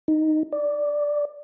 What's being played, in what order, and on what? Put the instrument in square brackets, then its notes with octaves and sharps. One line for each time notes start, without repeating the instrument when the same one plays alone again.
[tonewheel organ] D#4
D5